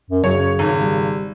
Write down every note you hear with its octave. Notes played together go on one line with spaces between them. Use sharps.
F#2
F#2 C#3 F#3 C#5
G#1
G3